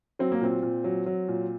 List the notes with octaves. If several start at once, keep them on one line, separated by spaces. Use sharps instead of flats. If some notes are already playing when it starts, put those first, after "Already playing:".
F#3 C4
A#3
A#2 C4
A#2
F#3
F#3
A#2